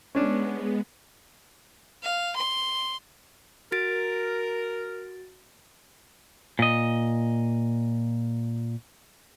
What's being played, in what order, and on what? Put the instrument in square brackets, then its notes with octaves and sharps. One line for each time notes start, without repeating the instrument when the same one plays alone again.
[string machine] G#3 B3 [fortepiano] C#4 D4
[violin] F5
C6
[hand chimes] F#4 A6 D7 [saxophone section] A#4
[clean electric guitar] A#2 D#5